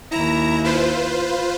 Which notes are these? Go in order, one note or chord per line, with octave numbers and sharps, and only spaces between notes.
D#2 E4 A#5
F4 B4 C5